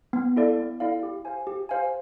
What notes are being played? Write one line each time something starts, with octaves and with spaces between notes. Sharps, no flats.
B3
E4 A4 D5 F5
B3
E4 A4 D5 F5
G4
C5 F5 G#5
G4
C5 F5 G#5